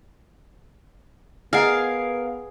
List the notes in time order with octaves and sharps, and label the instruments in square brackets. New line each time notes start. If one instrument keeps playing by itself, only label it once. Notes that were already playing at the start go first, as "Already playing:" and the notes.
[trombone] B3 [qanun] G#4 [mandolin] A#4 F5 [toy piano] D#5 F#5